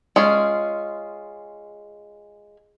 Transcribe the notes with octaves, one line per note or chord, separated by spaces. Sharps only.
G#3 C#4 F4